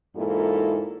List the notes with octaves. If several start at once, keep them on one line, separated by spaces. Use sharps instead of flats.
E2 G#2 A#3 E4 F4 A4